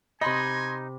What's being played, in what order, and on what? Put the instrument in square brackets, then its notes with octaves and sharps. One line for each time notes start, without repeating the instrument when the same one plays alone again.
[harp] C3 B5 [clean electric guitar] D#4 [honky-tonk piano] D#5 C6 [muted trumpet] G#5